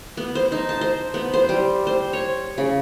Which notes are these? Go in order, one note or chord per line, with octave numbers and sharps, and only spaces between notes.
B3
C5
D#4
A5
C5
B3
C5
G3
C5
C#5
C#3